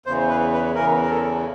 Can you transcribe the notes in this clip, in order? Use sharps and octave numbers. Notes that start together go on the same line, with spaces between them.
E2 C#3 E3 C5
B4
B4
E2 C#3 E3 A#4
A#4
A4